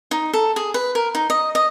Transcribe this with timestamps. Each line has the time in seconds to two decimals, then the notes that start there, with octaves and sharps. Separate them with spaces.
0.11 D#4
0.34 A4
0.56 G#4
0.74 B4
0.95 A#4
1.15 D#4
1.30 D#5
1.55 D#5